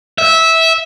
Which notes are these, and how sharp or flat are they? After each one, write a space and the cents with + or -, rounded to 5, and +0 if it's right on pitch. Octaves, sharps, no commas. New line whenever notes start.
E5 -15